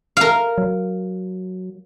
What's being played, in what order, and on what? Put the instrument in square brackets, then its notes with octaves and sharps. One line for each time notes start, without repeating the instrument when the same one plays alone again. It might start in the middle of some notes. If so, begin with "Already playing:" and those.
[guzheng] A#4 F5
[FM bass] F#3